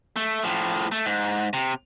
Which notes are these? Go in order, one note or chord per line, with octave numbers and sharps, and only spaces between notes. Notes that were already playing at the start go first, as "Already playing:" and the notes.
A3
A2 F3
A3
G#2
C3